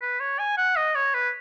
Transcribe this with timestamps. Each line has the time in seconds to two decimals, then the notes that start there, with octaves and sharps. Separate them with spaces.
0.02 B4
0.20 C#5
0.39 G#5
0.58 F#5
0.76 D#5
0.95 C#5
1.14 B4